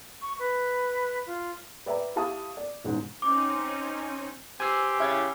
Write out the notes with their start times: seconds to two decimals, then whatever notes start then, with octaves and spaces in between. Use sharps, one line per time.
0.22 C#6
0.39 B4
1.27 F4
1.86 B4 D5 E5 G5 A#5
2.16 E4 G4 F5 A5 C#6 D#6
2.57 D5
2.84 E1 A1 G#2
3.22 C4 C#4 D#4 D6
4.60 C4 G4 G#5 E6 C7
5.00 C#3 E4 G#6 A6